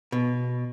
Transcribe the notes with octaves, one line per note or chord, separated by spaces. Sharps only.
B2